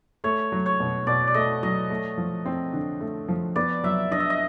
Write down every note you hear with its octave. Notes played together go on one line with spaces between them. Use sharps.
A3 C#5
F#3
C#5
B2
B2 D5
D5
A3 D#5
F#3 D#5
A3
F3
C4
D3
A3
F3
B3 D5
F#3 E5
D4 D#5
E5
D#5